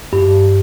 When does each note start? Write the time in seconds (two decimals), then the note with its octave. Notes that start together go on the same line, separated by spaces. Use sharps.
0.13 G2